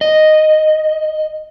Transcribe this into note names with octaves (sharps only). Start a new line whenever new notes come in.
D#5